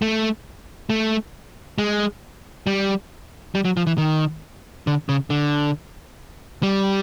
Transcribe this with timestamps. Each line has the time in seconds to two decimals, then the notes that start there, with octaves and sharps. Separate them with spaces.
0.02 A3
0.90 A3
1.78 G#3
2.67 G3
3.55 G3
3.65 F#3
3.77 F3
3.87 E3
3.98 D#3
4.87 D3
5.09 C#3
5.30 D3
6.63 G3